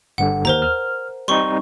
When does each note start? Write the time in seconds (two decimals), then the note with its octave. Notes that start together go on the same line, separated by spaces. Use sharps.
0.18 G1 G2 D3 F#5
0.45 D#2 A#4 C5 A#5
0.62 F6
1.28 G3 C4 D#4 C6 C#6